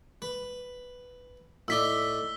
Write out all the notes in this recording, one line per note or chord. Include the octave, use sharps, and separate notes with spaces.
B4
A2 D#4 D5 E6 B6 G7